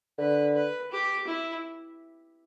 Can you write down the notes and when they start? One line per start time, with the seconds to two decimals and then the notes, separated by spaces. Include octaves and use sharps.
0.18 D3 B4
0.55 B4
0.91 G4
1.27 E4